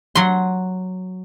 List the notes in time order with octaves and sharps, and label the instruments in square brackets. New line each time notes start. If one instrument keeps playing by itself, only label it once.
[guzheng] F#3 C6